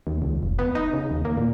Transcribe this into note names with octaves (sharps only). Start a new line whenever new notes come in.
D#2
C#2
F1
B3
D#4
C#3
D#2
A#3
A#2